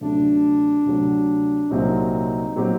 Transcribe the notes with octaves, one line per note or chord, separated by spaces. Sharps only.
D2 C3 F#3 D4
D2 C3 F#3
C2 A#2 F#3 C4 D#4 G4
A#2 F#3 C4 G4